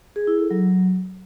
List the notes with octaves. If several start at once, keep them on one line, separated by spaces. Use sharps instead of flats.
G#4
E4
A4
F#3